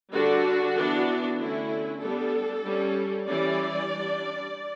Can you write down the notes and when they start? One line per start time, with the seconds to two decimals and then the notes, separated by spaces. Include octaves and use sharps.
0.13 D3 G3 D4 F#4
0.76 E3 B3 D4
1.39 D3 A3 C#4 E4
2.01 G3 B3 D4 A4
2.64 G3 C#4
3.26 E3 G3 C#4 D5
3.89 G3 D4